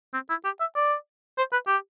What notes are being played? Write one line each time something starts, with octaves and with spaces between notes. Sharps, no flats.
C4
E4
G4
E5
D5
C5
B4
G4